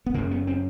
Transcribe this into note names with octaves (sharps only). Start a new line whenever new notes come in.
B3
F#2 C#3 A#3
B3
C4